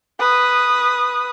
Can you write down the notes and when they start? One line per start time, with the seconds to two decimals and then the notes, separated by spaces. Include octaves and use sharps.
0.19 B4 D#6